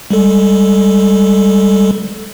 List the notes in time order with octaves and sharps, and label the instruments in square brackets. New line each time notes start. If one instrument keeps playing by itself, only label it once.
[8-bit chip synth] G3 G#3 A4